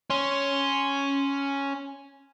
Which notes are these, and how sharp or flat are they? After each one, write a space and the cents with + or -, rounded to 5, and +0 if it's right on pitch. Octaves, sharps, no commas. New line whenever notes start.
C#4 +0 C6 +0